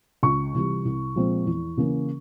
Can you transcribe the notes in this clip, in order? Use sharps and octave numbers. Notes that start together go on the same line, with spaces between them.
C#2 C#6
C3 E3 G3
C2
A#2 F3 G#3 C4
E2
C#3 E3 A#3 C#4